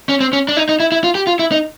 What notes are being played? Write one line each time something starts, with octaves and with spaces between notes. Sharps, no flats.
C#4
C4
C#4
D4
D#4
D#4
E4
E4
F4
G4
F4
E4
D#4